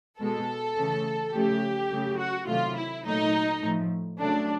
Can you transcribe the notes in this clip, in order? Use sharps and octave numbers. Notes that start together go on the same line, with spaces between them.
B2 G#3 A4
C#3 E3 A3
C#3 F3 A3 G4
C#3 F#3 A3
F#4
C3 D#3 F#3 A3 F4
E4
A#2 F#3 A3 D#4
A2 F3 A3
C#3 F#3 A3 D4